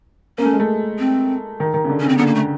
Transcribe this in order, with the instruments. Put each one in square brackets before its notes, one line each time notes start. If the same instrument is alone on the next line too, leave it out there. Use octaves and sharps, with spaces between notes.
[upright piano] A#3 [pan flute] C#4
[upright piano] A3
G#3
A3
[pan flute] C4
[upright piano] D#3
D#3
C#3
D3
[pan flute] C#4
[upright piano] C#3 [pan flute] C4
[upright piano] D3 [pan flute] B3
[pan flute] A#3
A3